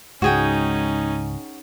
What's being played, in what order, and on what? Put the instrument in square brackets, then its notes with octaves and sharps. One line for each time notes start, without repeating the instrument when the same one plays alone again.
[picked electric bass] C#2 G#2 [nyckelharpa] C#4 D#4 [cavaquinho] F#4 G#4 G5